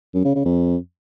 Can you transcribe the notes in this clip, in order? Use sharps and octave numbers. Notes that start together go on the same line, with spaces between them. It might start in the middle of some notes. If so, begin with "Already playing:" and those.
F#2
C#3
C#3
F2